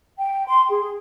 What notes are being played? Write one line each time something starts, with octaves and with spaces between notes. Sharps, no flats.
G5
C6
G#4